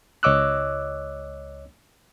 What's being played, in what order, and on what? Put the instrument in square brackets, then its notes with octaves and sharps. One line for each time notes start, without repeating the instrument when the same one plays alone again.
[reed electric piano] C#2 C#5 D#5 D6 E6 F#6